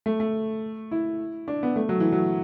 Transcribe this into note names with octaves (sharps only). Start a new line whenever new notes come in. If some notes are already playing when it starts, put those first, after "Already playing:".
A3
A3
E4
D4
B3
A3
F#3
E3
F#3